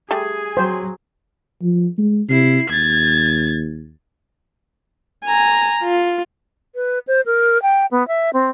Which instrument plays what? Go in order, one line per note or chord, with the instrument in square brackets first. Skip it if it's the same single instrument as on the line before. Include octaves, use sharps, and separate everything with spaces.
[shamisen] G3 A3 [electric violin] G#4 G#5
[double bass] F#3 [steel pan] C5
[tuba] F3
G#3
[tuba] C3 [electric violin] E4 C7
[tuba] D#2 [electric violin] G#6 A6
[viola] G#5 A#5
F4
[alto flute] B4
C5
A#4
G5
B3
E5
C4